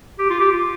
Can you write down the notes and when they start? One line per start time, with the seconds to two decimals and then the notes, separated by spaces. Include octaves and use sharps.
0.19 G4
0.30 F4
0.40 G4
0.52 F4